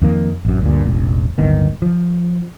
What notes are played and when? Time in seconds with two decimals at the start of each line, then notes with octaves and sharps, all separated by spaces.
0.02 F2 D#3 A#3
0.45 A1 F#2
0.62 D2 G2 A#2
0.85 E1 A1
1.38 D1 G1 D#3 B3
1.82 F3